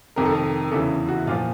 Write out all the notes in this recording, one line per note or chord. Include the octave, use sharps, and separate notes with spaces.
F2 C3 D#3 A#4
A4
A#4
E2 C#3 E3 A4
F#4
A#2 F3 F4